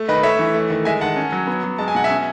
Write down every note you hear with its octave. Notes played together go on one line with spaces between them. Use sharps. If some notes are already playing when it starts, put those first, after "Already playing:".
Already playing: A3
D#3 B4 D#5
A3 C#5 E5
E3
A3
D#3
G#3 E5 G#5
D#3 F#5 A5
C#4
F#3
B3
F#3
G#3 A5
G#5
B2 F#5
E5 G#5
C#4